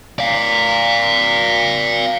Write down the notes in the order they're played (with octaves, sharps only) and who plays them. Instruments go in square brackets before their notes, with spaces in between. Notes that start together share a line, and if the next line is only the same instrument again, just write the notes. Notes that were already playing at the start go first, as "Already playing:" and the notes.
[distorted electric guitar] D5 F5